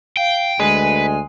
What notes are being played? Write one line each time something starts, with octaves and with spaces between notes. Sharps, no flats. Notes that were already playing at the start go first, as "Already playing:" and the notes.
F5 G5
D2 G#3 B4 G#5